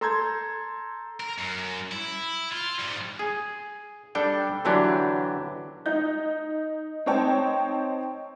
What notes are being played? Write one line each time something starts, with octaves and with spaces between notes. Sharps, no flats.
A4 A#5 C6 E6 G6 G#6
A#4
F#2
E4
F4
G#2 G3
G#4
G3 D4 A4 G5
D3 E3 F#3 D4 G4
D#4 G6
C4 D#4 C#5 G5 A5